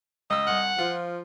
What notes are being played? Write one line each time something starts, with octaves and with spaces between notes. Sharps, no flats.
C#2 D#5 E6
C2 F#5 F6
F3 F4